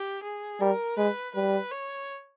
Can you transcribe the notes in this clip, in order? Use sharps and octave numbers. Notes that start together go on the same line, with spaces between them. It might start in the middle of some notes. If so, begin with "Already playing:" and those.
Already playing: G4
G#4
G3 A#4
G#3 B4
G3 B4
C#5